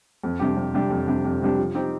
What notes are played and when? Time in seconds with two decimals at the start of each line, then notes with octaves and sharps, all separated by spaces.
0.24 F2
0.40 C3 G3 D4 G4
0.57 F2
0.74 C3 G3 D4 G4
0.90 F2
1.08 C3 G3 D4 G4
1.25 F2
1.41 C3 G3 D4 G4
1.58 F3
1.75 C4 D#4 G4